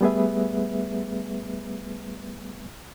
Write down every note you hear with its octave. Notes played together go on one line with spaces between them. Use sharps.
G3 A3 B3 G#4 B4 E5